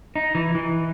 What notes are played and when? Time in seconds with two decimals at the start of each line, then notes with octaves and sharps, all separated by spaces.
0.16 D#4
0.35 E3
0.55 E3